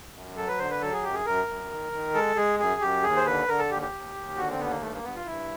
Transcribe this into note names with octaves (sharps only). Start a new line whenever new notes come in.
F#2
F#3 A4
B4
D3 C5
B4
F#3 A4
G#4
F#2 G4
G#4
F#2 A#4
F#2
D#3
D#3
G#3 A4
G#3 G#4
F#2 G#4
F#2 G4
D#2 G#4
C5
D3 B4
D3 A#4
A4
D#2 G4
G4
D#2
D#2
D3 F#4
C4
D#2 B3
A#3
G2 A3
A#3
G2 B3
F4
G2 E4